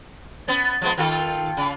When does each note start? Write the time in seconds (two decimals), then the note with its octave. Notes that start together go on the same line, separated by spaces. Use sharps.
0.48 B3 C#4 A6
0.81 F3 G#3 B3
0.98 D#3 F4 A4 G5
1.57 C#3